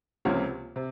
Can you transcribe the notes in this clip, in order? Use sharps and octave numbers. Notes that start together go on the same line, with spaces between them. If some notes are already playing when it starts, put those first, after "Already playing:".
C#2 C3 F3 A#3 C#4
C3